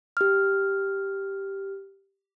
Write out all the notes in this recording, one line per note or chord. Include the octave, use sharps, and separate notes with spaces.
G4 F6